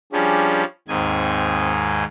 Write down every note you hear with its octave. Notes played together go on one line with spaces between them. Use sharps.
F3 G3 C#4 D4 G#4
D#2 G#2 C4 G#5